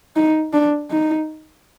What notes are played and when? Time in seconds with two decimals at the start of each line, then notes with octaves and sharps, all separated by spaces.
0.16 D#4
0.53 D4
0.91 D#4